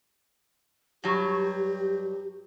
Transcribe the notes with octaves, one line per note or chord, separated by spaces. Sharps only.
G2 F#3 G4